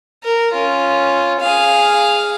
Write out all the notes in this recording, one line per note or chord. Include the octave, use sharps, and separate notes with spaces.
A#4
C#4 F4
G#4 F5